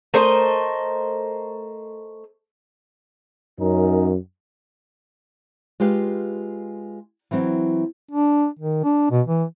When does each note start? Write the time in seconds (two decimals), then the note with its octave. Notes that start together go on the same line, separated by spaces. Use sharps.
0.14 A3 A#4 C5 D#5
3.60 F#2 C#4 D#4 A#4
5.80 G#3 F4 G4 B4 F5
7.31 E3 F#3 C4 E4
8.11 D4
8.59 D#3
8.84 D4
9.11 B2
9.27 E3